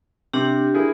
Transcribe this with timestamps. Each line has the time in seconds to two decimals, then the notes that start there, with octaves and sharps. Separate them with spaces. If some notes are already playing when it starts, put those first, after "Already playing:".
0.33 C3 D4 G4
0.74 E4 G#4 A#4